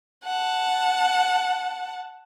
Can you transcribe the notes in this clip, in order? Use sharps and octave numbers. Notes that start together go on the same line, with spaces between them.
F#5 A5